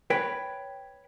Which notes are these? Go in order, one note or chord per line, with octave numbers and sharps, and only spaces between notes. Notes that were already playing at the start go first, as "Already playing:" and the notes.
B4 C#5 G5